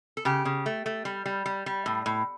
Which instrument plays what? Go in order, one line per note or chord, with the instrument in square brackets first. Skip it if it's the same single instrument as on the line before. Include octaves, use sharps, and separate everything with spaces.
[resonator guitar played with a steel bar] A4
C#3 G4
C#3
A3
A3
G3
G3
G3
G3
A2
A2